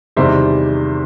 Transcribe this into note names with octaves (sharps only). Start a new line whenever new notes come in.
E2 C3 D#3 G3 C5 E5